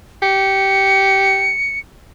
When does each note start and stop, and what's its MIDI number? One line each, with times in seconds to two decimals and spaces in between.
0.22 1.52 67
0.22 1.79 97